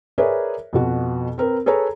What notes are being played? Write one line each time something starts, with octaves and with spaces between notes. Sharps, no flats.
G#4 A#4 B4 C#5 D5 E5
F2 B2 F#4
C4 A#4 B4
G#4 A4 B4 C#5 A#5